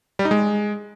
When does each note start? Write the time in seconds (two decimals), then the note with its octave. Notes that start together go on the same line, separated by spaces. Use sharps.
0.19 G3
0.25 D#4
0.31 G#3